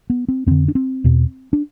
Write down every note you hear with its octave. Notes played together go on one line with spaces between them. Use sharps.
B3
C4
F2 D3 C4
D4
C4
E2 B2
D4